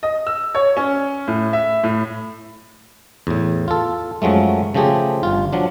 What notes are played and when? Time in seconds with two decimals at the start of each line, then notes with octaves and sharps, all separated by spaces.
0.03 D#5
0.27 E6
0.55 C#5
0.77 C#4
1.28 A2
1.53 E5
1.84 A2
3.27 E2 A2
3.68 F4 A4
4.22 F#2 F3 F#3 G#3 A3
4.74 C#3 F3 A3 G4 G#4 C5
5.23 G1 F4
5.53 F3 F#3 D4